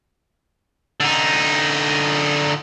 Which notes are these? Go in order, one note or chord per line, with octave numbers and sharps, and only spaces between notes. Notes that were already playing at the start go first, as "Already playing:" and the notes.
D3 D#4